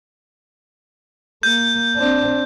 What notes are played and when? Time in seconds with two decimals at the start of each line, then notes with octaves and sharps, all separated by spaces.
1.43 A#3 G6
1.96 C4 D4